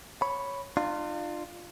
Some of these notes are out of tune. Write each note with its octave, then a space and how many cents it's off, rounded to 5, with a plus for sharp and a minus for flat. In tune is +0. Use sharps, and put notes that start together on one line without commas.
C#5 +0 B5 +0
D4 +45 F4 +0